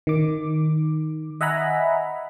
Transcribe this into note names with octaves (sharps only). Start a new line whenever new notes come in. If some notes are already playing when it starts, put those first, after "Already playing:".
D#3 D6
D#5 E5 F#5 G#5 A#5 B5